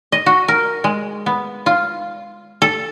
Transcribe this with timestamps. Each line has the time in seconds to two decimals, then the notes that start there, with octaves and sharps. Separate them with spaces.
0.12 D#5
0.26 F#4
0.48 A#4
0.84 G#3
1.26 B3
1.66 F4
2.62 A4